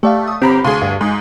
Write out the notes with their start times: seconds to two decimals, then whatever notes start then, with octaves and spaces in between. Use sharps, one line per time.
0.03 A3 G4 D5 F5
0.27 D#6
0.42 G1 C4 G4 A#5 B5
0.64 D2 G#4 F5 C6
0.82 G2 F5
1.01 G#2 G#3